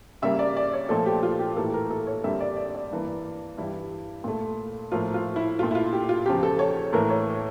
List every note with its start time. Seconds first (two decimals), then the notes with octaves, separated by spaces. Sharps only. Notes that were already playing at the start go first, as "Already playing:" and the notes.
0.22 C#3 G3 A#3 E5
0.39 D5
0.56 D5
0.73 C#5
0.89 A#2 F3 A3 A4
1.06 G4
1.23 F4
1.39 G4
1.57 A2 E3 A#3 A4
1.74 A#4
1.90 A4
2.07 C#5
2.24 F2 D3 G3 A#3 E5
2.40 D5
2.56 D5
2.74 D5
2.91 G2 E3 A#3
3.57 G2 E3 G3 E4
4.24 A#2 A3
4.92 A2 F3 A#3 F4
5.14 F4
5.36 E4
5.58 A#2 A3 F4
5.71 E4
5.75 F4
5.93 G4
6.09 F4
6.26 E2 C#3 F3 G4
6.43 A4
6.59 C#5
6.93 A2 E3 A#3 A#4
7.10 C#5